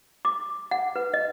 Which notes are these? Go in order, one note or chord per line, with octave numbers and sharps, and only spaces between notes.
D6
F#5
B4
D#5